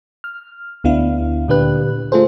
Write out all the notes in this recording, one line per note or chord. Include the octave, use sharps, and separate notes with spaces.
F6
D2 B3 D4 E4 F5
A#2 D3 D4 G4 B4 F#6
A3 F4 G#4 A4 C5